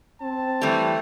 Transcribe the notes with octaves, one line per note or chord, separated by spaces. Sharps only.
C4 A5
E3 G3 A3